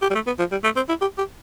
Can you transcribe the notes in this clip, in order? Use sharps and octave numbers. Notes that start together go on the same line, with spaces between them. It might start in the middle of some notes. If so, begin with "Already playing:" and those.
G4
G3
A3
B3
F3
G3
A3
C4
E4
G4
G4